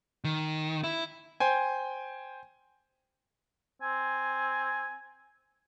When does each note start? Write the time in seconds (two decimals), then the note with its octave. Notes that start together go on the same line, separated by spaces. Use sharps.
0.24 D#3
0.84 E4
1.40 C5 G5 G#5
3.82 C4 G#5